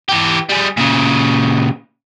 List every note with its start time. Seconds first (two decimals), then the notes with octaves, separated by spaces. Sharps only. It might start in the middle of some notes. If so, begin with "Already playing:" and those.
0.09 E3 G4
0.49 G3 G#4
0.77 A#2 C#3